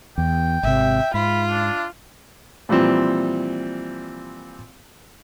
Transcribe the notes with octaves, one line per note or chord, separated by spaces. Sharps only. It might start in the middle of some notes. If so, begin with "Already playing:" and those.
E2 G5
G#1 C3 E5
G#2 F4 B5
D4
A#2 E3 F3 G3 C4